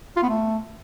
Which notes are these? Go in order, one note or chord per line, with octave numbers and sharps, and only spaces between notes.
F4
B3
A3